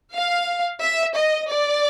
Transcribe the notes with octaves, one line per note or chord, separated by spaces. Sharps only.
F5
E5
D#5
D5